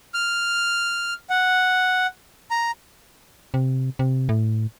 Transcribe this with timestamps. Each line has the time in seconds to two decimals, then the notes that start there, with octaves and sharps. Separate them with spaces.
0.14 F6
1.30 F#5
2.51 A#5
3.54 C3
3.99 C3
4.29 A2